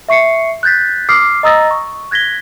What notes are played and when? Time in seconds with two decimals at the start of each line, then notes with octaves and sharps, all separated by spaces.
0.09 E5 C#6 C7 C#7
0.63 F#6 G6 A6 B6
1.09 D6 D#6 F6 C7
1.43 D#5 A#5 D#6 E6 A6 A#6
1.71 C#6
2.11 F#6 G#6 A#6 B6 G7